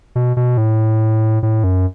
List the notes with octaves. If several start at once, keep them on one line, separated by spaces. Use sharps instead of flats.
B2
B2
A2
A2
F#2